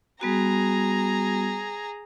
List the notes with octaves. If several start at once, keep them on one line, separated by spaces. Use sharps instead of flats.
G3 B3 F#4 G#4 A#5